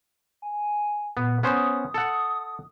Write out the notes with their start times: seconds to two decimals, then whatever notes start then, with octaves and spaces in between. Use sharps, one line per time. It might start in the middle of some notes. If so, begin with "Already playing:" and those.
0.42 G#5
1.17 A#2 B3
1.43 B3 C#4 C5 D#6
1.94 A4 F#5